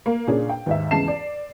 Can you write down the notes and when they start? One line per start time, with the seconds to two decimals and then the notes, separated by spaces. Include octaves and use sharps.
0.06 A#3
0.27 A#2 C#3 C#4 D4 G#4
0.49 G5
0.66 D#2 G#2 E5
0.91 E2 C#3 G#3 A5 C7 E7
1.08 D5